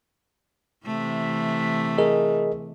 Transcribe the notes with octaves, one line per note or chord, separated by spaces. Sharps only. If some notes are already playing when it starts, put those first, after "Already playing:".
C3 E3 A3
G#4 A#4 D#5